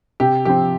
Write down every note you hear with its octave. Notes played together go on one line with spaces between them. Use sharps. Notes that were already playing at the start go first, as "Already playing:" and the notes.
C3 G4
F3 C4 G4